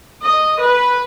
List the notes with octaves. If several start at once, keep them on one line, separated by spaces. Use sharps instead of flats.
D#5
B4